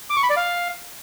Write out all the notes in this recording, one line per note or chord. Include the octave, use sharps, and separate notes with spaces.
D6
C#6
B5
D5
F5